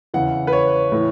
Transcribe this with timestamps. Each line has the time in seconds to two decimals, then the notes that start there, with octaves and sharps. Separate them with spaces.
0.14 E2 C#3 E3 F#5
0.47 B4
0.53 C#5
0.92 A2 E3